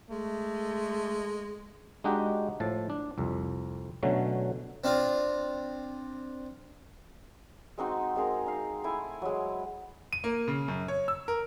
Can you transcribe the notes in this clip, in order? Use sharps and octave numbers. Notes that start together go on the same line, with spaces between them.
G#3 A3
G#3 D4 D#4 F#4 G4
A2 F3 A5
D4
C2 F2
B2 D3 F#3 A3 C#4
C4 D4 F4
G#3 C4 D#4 F#4
G#3 C4 G#4 A#4
D#4 F5
A3 E4 G#5
F#3 G#3
D#7
A#3
C#3
F#2
C#5
E6
A#4